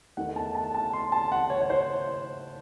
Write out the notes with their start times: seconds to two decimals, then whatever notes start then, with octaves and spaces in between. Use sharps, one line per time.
0.17 E2 D#3 A3 D#4 F#5
0.36 A5
0.55 A5
0.74 A5
0.93 C6
1.12 A5
1.32 F#5
1.50 C#5
1.61 C#5
1.70 C5